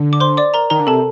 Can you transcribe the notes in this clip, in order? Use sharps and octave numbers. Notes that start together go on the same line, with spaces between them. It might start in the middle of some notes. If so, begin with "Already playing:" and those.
Already playing: D3
D6
C5 C6
D5 D6
A#4 A#5
D#3 A#4 A#5
D3
C3 A4 A5